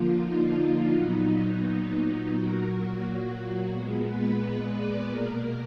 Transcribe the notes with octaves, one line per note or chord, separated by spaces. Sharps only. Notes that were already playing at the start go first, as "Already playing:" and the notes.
Already playing: D3 F3 A#3 F4
D#4
D#4
A#2 F#3 B3 D#4
D#4
A#2 F#3 A#3 F#4
A#2 G#3 B3
B4
D5
B2 A#3 A#4